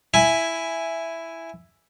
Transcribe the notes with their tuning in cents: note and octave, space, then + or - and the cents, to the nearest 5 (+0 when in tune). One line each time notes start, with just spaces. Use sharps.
E4 +5 G#5 +0